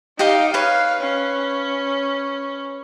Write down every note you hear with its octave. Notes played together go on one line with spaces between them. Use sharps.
D#4 G4 D#5 F5
B4 C#5 F5
C#4